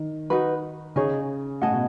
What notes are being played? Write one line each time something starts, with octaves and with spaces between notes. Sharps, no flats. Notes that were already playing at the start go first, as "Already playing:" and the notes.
Already playing: D#3
D#4 F#4 B4
C#3 D#4 G#4 C#5
A2 G#4 D#5 F#5 A5
B2